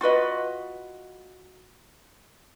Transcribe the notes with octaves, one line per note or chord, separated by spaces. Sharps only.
F4 F#4 B4 D#5